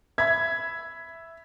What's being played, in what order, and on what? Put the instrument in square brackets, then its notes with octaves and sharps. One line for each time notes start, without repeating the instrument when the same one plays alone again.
[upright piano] E5 B5 [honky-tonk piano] G#6